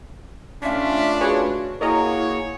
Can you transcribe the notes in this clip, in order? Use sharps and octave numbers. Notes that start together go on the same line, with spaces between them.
A2 C#4 D4 F4 E5
F#4 G#4 B4 C#5
A#3 E4 F#4 G#4 A#4 C#5 D#5 A#5